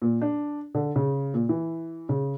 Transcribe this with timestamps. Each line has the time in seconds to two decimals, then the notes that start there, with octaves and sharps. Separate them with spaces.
0.02 A#2
0.21 D4
0.75 D3
0.96 C#3
1.34 A#2
1.49 E3
2.09 C#3